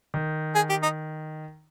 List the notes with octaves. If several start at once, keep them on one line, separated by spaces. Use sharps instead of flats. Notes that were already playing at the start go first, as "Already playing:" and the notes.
D#3
G#4
G4
D#4